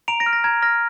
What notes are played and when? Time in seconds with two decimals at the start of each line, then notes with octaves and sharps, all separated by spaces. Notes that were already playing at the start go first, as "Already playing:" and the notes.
0.08 A#5 D7 F7
0.20 A#6 D7
0.26 F6
0.33 A#6
0.44 A#5 G#6
0.62 F6 A#6